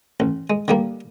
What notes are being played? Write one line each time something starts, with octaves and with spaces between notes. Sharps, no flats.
A1
G#3
D3 G3 A#3